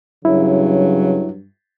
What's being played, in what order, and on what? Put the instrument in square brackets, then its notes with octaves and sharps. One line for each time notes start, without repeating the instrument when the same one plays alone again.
[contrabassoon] G2 [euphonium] C#3 [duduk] F#3 [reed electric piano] E4